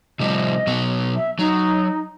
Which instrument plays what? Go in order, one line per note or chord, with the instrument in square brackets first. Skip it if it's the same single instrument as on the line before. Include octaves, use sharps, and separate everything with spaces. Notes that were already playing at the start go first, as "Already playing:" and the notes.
[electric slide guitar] C3 F3 G3 [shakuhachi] D#5
[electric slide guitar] B2 F#3 B3
[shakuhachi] E5
[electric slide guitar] F#3 [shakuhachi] D#4